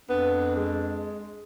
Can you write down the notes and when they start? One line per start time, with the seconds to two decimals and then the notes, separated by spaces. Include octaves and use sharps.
0.09 F2 B3 D4
0.56 G#3